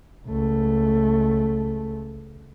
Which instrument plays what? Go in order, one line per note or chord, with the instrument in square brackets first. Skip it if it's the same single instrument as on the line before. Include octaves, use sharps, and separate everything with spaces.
[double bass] C#2 A3